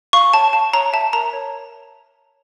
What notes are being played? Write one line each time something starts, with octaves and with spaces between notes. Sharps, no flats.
F5 C#6
C#5 A5
F5 A5
C#5 A#5
E5 A5
A#4 A#5
C#5